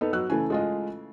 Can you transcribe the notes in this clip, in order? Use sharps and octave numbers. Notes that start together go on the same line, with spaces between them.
B3 D#4 A4
F#3 E6 F#6
C#3 E3 A3 G#5
G#3 F4 D#5